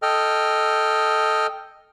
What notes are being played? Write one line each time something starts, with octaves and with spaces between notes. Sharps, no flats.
A4 D#5 G5 F6